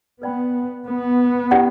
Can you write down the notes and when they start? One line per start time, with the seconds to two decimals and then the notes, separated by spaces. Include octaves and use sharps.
0.22 B3 B4 D5 G5 B5
0.86 B3
1.51 C#4 E4 G4 D5 F#5